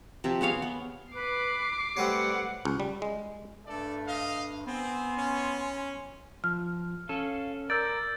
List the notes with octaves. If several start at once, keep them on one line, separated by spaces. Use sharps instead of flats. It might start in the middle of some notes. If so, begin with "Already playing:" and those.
C3 F3 E5
B3 G#4 C#5 F5
B3
B4 D6 C7
G3 A3 C4 B4 C#5 F#5
C#2
G3
G#3
G2 A3 A4 D5
D#5 F5
B3 C4 G#5 C6
C#4
F3 F6
C#4 A4 F5
A#4 D5 E6 G6 A6